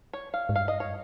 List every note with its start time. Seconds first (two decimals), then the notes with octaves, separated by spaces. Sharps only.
0.13 C#5
0.34 F5
0.49 G#2
0.55 G2 F5
0.68 D#5
0.80 C#5